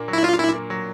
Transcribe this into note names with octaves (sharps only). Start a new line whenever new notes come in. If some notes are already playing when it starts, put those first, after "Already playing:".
Already playing: A#2 A#3 D4
F#3
E4
D4 F4
A#2 E4
A#3
F#3